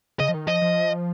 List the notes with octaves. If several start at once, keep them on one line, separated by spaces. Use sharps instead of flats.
C#3 D#5
F3
D#3
F3 D#5
F3